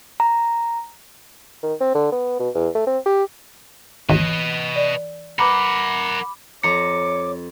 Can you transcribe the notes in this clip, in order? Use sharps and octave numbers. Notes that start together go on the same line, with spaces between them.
A#5
D#3
C4
D3
B3
B2
E2
A3
C4
G4
G#1 D#2 E3 B4 D#5
D5
A#4 B4 F#5 A#5 B5 D6
F2 C#5 A#5 D6 C#7